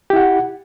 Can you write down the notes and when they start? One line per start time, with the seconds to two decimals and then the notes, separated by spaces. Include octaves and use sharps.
0.10 G4
0.13 E4
0.16 F#5